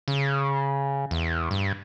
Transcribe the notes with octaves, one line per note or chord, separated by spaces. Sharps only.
C#3
E2
G2